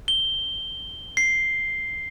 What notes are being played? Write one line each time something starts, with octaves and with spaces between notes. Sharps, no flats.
G7
C7